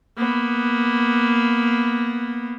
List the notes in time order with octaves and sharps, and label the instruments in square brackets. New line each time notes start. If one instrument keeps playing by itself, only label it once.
[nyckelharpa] A#3 B3